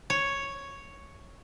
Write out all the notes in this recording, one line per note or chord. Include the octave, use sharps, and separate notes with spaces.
C#5